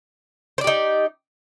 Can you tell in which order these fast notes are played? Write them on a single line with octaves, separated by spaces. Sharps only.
C5 D5 G4 D#4